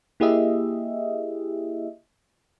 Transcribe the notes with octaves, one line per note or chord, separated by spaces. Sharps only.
A#3 E4 G4 G#4 D#5 E5